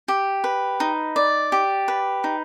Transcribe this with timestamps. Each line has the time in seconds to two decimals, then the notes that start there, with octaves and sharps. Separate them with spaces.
0.08 G4
0.44 B4
0.80 D#4
1.16 D5
1.52 G4
1.88 B4
2.24 D#4